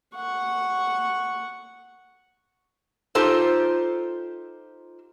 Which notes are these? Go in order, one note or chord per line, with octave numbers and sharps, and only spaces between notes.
F#5 C#6
D#4 F4 G4 A4 C5